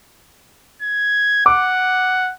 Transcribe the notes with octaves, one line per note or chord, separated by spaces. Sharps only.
G#6
F#5 D6